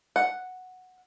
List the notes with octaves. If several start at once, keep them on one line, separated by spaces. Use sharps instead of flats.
F#5